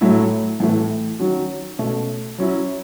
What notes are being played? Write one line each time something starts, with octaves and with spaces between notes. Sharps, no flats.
A2 F#3 A3 E4
A2 E3 A3
D#3 F#3 C#4 F#4
B2 A3 C#4
F#3 C#4 E4